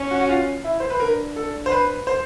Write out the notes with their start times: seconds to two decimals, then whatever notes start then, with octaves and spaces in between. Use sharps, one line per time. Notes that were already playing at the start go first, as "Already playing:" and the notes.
Already playing: C#4
0.11 F#4
0.21 F#4
0.29 F4
0.64 E4
0.80 C5
0.90 B4
1.00 D4 A#4
1.36 A4
1.66 C5
1.72 B4
2.07 C5